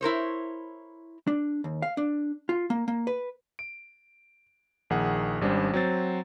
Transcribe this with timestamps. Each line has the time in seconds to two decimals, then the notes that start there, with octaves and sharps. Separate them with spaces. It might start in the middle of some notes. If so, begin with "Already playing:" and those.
0.01 E4 A#4 C5 C#5
1.27 D4
1.64 D#2
1.82 F5
1.97 D4
2.49 F4
2.70 A#3
2.88 A#3
3.07 B4
3.59 D7
4.90 A#1 D#3 G#4 F#5
5.41 G#1 G3 C#4 D4 C5
5.73 F#3 C4 C5 A6